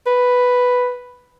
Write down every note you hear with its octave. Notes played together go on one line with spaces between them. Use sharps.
B4